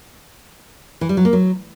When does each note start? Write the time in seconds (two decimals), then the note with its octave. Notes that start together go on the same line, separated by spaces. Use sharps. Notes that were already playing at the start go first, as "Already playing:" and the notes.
1.01 E3
1.09 G3
1.17 F#3
1.25 A#3
1.33 F#3